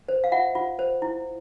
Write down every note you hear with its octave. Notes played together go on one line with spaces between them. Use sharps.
C5
F5
F4 E5 F#5
F4
C5
E4